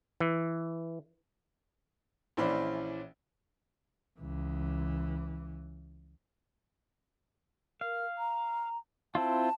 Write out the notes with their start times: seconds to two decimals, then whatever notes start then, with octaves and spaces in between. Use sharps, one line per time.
0.20 E3
2.37 A#1 E3 C#4 C5 D5 B5
4.19 C#2 E3
7.81 A#4 F5
8.18 A#5
9.15 C4 E4 F4 A5